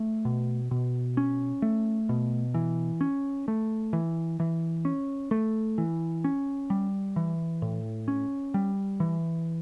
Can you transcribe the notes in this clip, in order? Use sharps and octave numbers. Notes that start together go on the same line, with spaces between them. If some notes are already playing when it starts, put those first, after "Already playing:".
Already playing: A3
B2
B2
C#4
A3
B2
E3
C#4
A3
E3
E3
C#4
A3
E3
C#4
G3
E3
A2
C#4
G3
E3